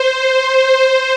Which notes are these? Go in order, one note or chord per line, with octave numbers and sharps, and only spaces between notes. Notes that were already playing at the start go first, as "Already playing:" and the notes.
Already playing: C5